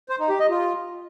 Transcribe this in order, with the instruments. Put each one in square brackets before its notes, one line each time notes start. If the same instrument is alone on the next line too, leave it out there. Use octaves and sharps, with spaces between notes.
[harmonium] C5
D#4
G4
D#5
F4